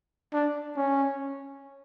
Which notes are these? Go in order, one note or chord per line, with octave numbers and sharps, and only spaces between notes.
D4
C#4